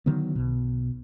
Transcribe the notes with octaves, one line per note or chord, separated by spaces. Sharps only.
D3 D#3 F#3 B3
B1 B2